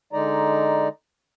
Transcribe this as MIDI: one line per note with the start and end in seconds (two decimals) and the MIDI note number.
0.13 0.88 50
0.13 0.88 56
0.13 0.88 63
0.13 0.88 74
0.13 0.88 82